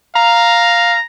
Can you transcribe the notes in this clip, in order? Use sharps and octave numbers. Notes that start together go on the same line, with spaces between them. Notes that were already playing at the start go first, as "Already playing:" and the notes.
F5 A#5